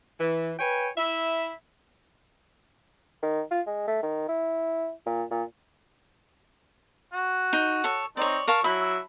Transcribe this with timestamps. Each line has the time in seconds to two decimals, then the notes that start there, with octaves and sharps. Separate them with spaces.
0.20 E3
0.59 B4 C#5 G5 G#5
0.97 E4 E5
3.22 D#3
3.51 F4
3.66 G#3
3.87 A3
4.03 D#3
4.28 E4
5.06 A#2
5.31 A#2
7.13 F#4
7.53 D#4
7.84 A4 C#5
8.17 C4 D#4 C#5 D5
8.48 A#4 F5 A5 C#6
8.64 F#3 E4 E5 B5